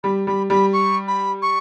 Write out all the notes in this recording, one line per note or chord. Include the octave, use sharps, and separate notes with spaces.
G3 B5
G3 B5
G3 B5
C#6
B5
C#6